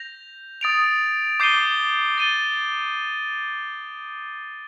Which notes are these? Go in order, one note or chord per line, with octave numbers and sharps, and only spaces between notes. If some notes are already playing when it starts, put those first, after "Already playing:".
Already playing: G6 A#6 F7
D#6 A6 D7 F7
D6 G6 C7 D#7 G7
A6 D#7 G7